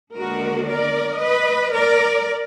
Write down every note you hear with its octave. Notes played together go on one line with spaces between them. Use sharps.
D#2 D3 G#3 B3 D4 F#4 A#4
A#4 D5
B4 D#5
A#4 D5